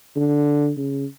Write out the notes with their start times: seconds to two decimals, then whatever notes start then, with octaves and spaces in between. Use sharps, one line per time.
0.16 D3
0.77 C#3